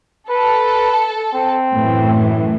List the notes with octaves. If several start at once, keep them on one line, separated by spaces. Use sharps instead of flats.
A4 B4
C4
F#2 A2 E3